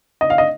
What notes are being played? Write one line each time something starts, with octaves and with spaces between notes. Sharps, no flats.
D#5
F5
D#5